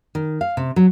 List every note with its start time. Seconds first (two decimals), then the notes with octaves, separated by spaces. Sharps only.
0.15 D#3
0.41 F5
0.57 C3
0.76 F#3